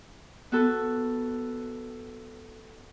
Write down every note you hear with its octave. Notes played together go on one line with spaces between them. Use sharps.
B3 F#4 A4